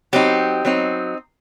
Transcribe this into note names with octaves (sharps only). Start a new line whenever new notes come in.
F#3 C4 D#4 G4
F#3 C4 D#4